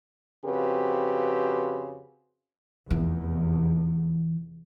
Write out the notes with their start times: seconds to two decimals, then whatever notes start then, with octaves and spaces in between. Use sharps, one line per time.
0.45 F2 C#3 C4 F#4 G4 B4
2.90 F1 E2 E3